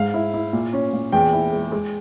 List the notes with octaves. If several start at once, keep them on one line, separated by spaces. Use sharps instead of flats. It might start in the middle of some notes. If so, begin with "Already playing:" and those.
Already playing: G#2 F5
E4
E4
A#2
C#4
A#2
E2 G5
E4
G#3
G#3